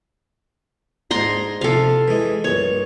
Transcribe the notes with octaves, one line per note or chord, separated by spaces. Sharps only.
G#2 D4 A#5 C6
C3 F3 A4 F5
E3 G#3
A#1 G2 C#5